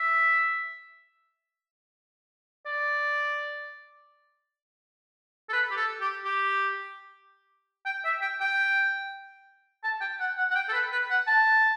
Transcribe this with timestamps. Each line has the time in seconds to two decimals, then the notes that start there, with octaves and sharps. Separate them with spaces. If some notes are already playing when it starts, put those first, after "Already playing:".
Already playing: E5
2.66 D5
5.49 A4
5.53 B4
5.71 G4
5.77 A4
6.01 G4
6.24 G4
7.86 G5
8.05 E5
8.22 G5
8.40 G5
9.84 A5
10.01 G5
10.20 F#5
10.37 F#5
10.51 F#5
10.55 G5
10.68 A4
10.73 B4
10.92 B4
11.10 F#5
11.27 A5